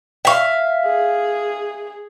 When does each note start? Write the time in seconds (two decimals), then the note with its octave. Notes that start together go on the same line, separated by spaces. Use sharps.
0.25 E5 F5 G5 C#6
0.86 G#4